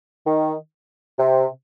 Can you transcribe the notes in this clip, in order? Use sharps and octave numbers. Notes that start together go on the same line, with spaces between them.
D#3
C3